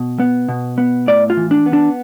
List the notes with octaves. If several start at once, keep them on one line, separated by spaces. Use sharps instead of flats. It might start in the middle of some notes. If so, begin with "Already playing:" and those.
Already playing: B2
B3
B2
B3
A2 D5
F4
E3
D4
B3
D4